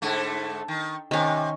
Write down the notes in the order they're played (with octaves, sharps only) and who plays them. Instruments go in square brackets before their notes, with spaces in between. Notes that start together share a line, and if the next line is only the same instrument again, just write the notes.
[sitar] G#2 D3 A3
D#3
[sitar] C3 [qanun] D#3 C#4